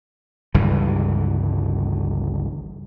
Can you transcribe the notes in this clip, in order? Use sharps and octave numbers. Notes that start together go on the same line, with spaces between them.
G1 C#2 G2 E3